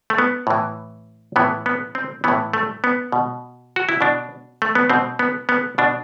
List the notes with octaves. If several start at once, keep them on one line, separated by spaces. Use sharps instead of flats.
A3
B3
A2 E3
A2 E3 B3
B3
C4
A2 E3 B3
A3
B3
B2
F#4
E4
B2 D4
A3
B3
B2 C4
B3
B3
B2 D4